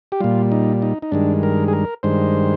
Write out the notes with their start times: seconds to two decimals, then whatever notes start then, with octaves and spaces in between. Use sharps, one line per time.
0.12 G4
0.20 A#2 G3 F4
0.52 D#4
0.82 D#4
1.02 D#4
1.12 G2 D#3 G#3 D4
1.43 A#4
1.68 G#4
1.73 A#4
2.03 G2 D#3 G#3 C5